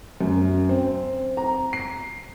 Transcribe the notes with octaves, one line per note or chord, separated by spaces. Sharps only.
F#2
C4
A#5
C7